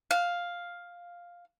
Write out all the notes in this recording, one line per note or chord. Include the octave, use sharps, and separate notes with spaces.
F5